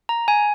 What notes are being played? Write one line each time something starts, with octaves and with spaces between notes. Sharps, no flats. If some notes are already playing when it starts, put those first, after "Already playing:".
A#5
G#5